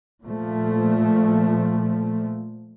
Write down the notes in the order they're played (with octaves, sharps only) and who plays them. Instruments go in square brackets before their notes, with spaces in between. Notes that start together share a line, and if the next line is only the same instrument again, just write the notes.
[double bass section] A#2 F3 A3